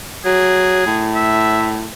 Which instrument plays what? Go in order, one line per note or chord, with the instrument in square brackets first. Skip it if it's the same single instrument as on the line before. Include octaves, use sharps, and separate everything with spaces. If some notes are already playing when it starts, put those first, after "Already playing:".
[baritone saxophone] F#3 [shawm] G#4
[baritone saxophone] A2
[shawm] E5